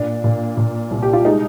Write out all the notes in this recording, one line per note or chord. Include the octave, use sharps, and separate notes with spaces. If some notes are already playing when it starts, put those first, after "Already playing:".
Already playing: A#2 D4
A#2
A#2
C2
G4
F4
G#3 D#4